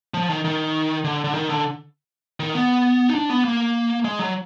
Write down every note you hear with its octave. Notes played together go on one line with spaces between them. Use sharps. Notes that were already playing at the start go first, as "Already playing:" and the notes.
F3
D#3
D#3
D3
D3
D#3
D3
D#3
B3
D#4
D4
B3
A#3
G#3
F#3